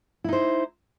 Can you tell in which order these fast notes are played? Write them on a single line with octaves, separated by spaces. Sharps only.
E4 D#4 C5